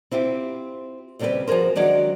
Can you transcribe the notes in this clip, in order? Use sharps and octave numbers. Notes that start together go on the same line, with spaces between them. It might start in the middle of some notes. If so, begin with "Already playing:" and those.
C4 E4 F4 G4
D#2 C#3 G3 C4 G4 B4
F3 F#4 G#4 A#4 C5
D#3 F#3 G#3 D4 G4